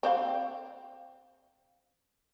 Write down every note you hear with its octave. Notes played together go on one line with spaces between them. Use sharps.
C4 C5 F5